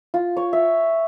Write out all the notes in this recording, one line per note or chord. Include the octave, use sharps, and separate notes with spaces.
F4
C#5
E5